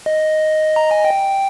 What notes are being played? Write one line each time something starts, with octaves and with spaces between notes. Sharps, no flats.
D#5
A#5
G#5
G5